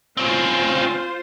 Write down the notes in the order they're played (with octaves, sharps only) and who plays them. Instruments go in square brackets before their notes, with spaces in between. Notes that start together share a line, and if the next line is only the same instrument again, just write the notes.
[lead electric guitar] C4 C#4 [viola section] F4 C5